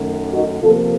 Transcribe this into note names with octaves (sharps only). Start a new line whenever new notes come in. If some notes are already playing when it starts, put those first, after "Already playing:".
Already playing: F#2 D#3 A3
D#4 F#4
C3 F3 A#3 F4 A4